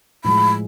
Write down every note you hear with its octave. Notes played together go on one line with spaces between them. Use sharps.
A2 F3 G#3 B5